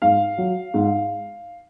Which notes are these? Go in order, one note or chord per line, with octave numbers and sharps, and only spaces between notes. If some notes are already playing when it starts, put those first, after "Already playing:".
G#2 F5
F#3
G#2